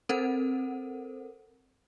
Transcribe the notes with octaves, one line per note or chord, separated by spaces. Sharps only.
C4 A4 A#4 C5 F#5